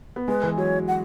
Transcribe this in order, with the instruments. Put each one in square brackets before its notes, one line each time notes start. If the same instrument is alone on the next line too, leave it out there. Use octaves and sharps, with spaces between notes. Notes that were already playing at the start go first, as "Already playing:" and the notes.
[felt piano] B3
[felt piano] G#3 [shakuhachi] B4
[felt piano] E3
[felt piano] F#3 [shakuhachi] C#5
[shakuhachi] F#5